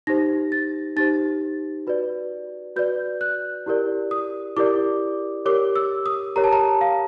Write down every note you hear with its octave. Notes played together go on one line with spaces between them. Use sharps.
D#4 G4 C5 A#6
A6
D#4 G4 C5 A6
F#4 B4 D5
F#4 B4 D5 G6
F#6
E4 G4 A#4 D5
D#6
E4 G4 A#4 D5 D6
G4 A#4 C#5 D6
E6
D#6
G4 A#4 C#5 A#5
A5
A#5
F5